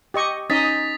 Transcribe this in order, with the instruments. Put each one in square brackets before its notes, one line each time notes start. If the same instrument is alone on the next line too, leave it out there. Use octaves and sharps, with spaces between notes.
[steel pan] G4 D#5 C#6
[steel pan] C#4 D#4 D#5 [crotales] D#6 A6 B6